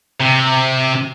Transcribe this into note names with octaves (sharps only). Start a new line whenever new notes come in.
C3